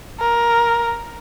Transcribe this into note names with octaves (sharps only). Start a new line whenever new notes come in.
A#4